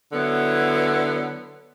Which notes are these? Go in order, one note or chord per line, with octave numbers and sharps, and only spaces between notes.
D3 F#3 B3 E4